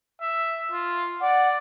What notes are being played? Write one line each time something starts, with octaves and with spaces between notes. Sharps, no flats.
E5
F4
D5 F#5